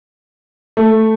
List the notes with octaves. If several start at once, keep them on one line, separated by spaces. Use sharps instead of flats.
A3